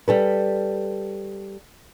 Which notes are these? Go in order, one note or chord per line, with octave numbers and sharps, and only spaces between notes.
G3 A4 B4